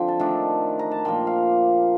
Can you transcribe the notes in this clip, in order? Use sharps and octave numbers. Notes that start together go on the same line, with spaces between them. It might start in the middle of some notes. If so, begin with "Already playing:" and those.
Already playing: D3 F3 C4 G5
A5
D#3 A3 D4
A#5
A5
A#2 F3 A#3 G5
F5